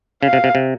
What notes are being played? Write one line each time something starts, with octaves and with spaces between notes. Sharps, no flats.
C#3 F5
C3
C3
C3